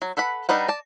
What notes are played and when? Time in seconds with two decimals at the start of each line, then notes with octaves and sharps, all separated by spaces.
0.02 F#3
0.17 A4 B4 F#5 B5
0.49 G3 D4 D#4 B4 F#5
0.68 D5 A5